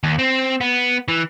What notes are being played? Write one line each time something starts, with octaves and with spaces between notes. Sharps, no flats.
D#2
C4
B3
E3